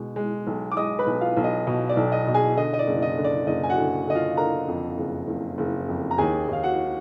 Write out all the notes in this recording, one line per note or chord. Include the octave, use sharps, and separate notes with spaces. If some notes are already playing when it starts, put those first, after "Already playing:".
Already playing: B2 G#3
G#3
B1
D6
G#3 D#5 D#6
B4 B5
B1
F4 F5
B1
D#5
B2 D#5
D5
B1
D#5
B2
G#4 G#5
D3 D#5
D#5
D5
F#1
D#5
D3
D5
F#1 D#5
G#5
F#4 F#5
D3
D3 D#5
F4 F5
D3 A#4 A#5
F2
F#1
F#1
F#1
F2
A#5
D#2 G#4 G#5
D#2 F5
F#4 F#5